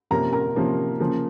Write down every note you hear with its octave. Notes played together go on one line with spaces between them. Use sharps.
C3 F3 A#3 C#4 A#4 A#5
A#4 A#5
C3 F3 A#3 C#4
C#3 F3 A#3